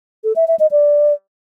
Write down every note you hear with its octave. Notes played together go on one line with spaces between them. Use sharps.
A4
E5
E5
D#5
D5